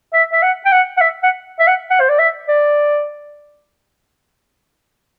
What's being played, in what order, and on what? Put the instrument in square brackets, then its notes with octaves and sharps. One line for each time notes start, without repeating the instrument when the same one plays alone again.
[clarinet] E5
E5
F#5
G5
F#5
F#5
E5
F#5
E5
F#5
F#5
C5
D5
E5
D5